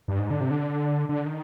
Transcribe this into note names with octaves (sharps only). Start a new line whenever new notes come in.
G2
G#2
D3
C3
D3
D3
D#3